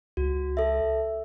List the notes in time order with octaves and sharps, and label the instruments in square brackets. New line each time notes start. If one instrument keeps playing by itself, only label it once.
[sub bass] C#2 [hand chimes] F#4
[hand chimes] A4 E5